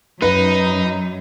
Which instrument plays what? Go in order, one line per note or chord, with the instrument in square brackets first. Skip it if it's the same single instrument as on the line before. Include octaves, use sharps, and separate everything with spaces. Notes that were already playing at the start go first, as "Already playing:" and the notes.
[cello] F#2 [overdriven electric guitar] D#4 [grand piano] B4